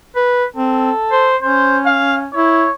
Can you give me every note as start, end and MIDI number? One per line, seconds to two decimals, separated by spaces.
0.16 0.45 71
0.56 0.91 60
0.56 1.34 69
1.11 1.36 72
1.42 2.28 61
1.42 1.79 72
1.86 2.17 77
2.33 2.67 64
2.33 2.72 73